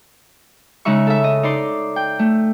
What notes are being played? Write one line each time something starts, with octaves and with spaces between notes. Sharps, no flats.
C#3 G#3 D#4 E5 C#6
A4 E5
D#5
D#4 D5 C6
G5
A3